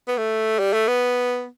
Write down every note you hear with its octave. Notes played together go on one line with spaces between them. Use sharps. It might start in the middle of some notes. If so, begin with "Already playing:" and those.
B3
A3
G3
A3
B3